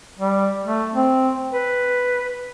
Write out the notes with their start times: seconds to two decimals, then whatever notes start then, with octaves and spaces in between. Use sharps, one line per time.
0.19 G3
0.64 A3
0.94 C4
1.53 B4